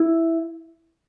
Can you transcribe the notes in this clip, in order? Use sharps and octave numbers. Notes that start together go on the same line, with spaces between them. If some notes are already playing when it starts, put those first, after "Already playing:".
Already playing: E4